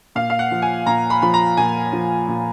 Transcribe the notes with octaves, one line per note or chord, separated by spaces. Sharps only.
A#2 F5
F5
F#5
F3
G#5
A#2 A#5
B5
F3 B5
A#5
A#2 G#5
F3
A#2